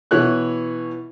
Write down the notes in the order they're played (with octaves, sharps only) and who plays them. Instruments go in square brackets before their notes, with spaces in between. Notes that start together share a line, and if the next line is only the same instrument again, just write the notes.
[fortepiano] B2 E3 C#5 F#6